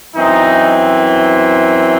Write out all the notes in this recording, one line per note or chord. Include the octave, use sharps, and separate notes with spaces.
F#2 E3 C4 D#4